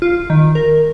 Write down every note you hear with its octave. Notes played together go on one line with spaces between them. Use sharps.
F4
D#3
A#4